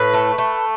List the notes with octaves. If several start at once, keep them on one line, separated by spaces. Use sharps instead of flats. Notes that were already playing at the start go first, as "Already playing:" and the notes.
Already playing: A2 B4
A3
A3